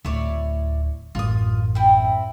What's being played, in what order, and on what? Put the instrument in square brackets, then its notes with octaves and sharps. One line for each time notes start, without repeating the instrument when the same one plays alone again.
[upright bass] D1 [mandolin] E4 C#5 D5
[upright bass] A1 F#2 [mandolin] F4 D#6
[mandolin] C4 E4